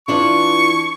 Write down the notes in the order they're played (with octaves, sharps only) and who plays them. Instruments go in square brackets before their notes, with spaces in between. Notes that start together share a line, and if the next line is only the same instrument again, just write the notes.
[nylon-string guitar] E3 D4 F4 [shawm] C#6